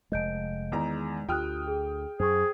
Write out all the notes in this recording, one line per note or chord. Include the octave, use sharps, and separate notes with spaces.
F1 G#3 D#5 G6 D7
E2 D#3 G#3 A#5
D2 F4 G4 G5 D#6 F6 F#6
G#4
F#2 G#4 C5 C#6